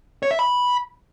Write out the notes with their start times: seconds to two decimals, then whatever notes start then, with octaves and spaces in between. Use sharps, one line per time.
0.23 C#5
0.31 E5
0.39 B5